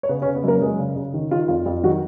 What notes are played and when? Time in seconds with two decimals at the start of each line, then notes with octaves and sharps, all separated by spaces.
0.03 C#5
0.09 C#3 B3 B4
0.22 C#4 C#5
0.26 C#3
0.35 B3 B4
0.44 F#2 A#3 A#4
0.61 F#2 G#3 G#4
0.79 C#3
0.96 C#3
1.14 D#3
1.31 D#3 F4
1.48 F2 F4
1.66 F2 F4
1.84 D#3 F#3 F#4